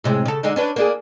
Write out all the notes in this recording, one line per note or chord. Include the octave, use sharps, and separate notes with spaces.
A2 C3 G#3
C#3 A4
D3 G#3 D#4
C#4 D4 B4
A#3 D4 G#4